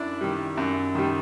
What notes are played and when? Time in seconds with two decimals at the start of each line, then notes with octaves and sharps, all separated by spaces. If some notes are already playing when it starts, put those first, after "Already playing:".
Already playing: F#2 D4 E4
0.21 D#3 G3
0.57 F#2
0.95 D#3 G3